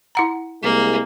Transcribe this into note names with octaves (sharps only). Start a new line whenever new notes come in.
E4 F#5 A#5
C2 G#3 A#3